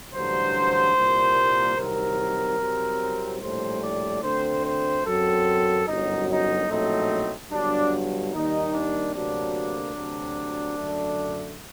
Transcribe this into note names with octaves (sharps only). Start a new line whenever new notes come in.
A1 G2 D3 F#3 C5
C2 A#2 G3 A#3
C2 C3 D#3 F#3 A#4
C2 C3 F#3 C4
A#1 A2 G3 C5
D5
D2 D3 A3 C4 C5
C5
F#2 F#3 C4 A4
G1 F#2 F#3 D#4
D#4
A#1 A2 F#3 A3 C4 D#4
G1 G2 F#3 D4
D#2 D#3 G3 A#3 D#4
D4
D2 C3 F#3 A#3 D4
D2 C3 F#3
F#2 D3 A3